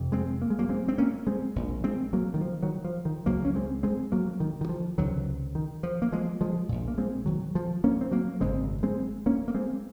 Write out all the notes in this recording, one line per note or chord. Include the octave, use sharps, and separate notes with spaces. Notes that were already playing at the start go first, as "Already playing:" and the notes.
Already playing: F1 F2 C3
G#3 C4
A#3
G#3
F#3 A#3
G#3 C4
C4
A#3 C#4
G#3 C4
A#1 A#2
G#3 C4
F#3 A#3
D#3
F3
D#3 F#3
F3
D#3
C#2 F#3 A#3
C#3
C#4
G#3 C4
G#3 C4
F#3 A#3
D#3
D#3
F3
C#2 C3 D#3 F#3
D#3
F3
A#3
F3 G#3
F3 G#3
A#1 A#2
A#3
G#3 C4
D#3 F#3
F3
A#3 C#4
C4
F#3 A#3
G#1 F#2 C#3 G#3 C4
G#3 C4
A#3 C#4
A#3
G#3 C4